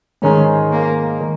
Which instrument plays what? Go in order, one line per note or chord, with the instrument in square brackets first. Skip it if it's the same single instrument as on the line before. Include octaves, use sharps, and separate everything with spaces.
[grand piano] G#2 D#3 G#3 D#4 G#4 [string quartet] C#4
[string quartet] A#3
[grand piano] D#3